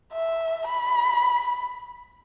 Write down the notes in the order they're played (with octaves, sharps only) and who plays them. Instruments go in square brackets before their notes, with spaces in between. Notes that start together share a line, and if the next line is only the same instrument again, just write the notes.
[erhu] E5
B5